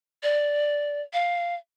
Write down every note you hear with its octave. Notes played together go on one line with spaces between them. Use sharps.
D5
F5